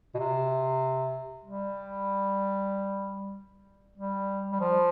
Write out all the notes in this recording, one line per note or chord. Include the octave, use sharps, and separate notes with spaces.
B2
C3
G3
G3
G3
F3